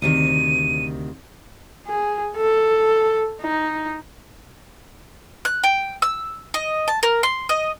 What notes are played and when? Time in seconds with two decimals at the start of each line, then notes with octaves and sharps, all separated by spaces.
0.02 D2 C3 D#3 D#7
1.87 G#4
2.37 A4
3.41 D#4
5.45 F#6
5.64 G5
6.02 E6
6.54 D#5
6.88 A5
7.03 A#4
7.23 C6
7.49 D#5